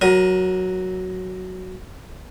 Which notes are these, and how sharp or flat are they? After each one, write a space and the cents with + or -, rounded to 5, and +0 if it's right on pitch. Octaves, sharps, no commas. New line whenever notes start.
F#3 +0 A#4 +25 D#6 +0